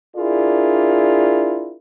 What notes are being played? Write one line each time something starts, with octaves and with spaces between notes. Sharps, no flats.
D4 E4 F4 G#4 A#4 D5